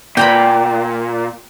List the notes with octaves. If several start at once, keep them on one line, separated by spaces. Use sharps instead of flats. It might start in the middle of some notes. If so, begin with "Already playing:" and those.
A#2 G5 A#5 B5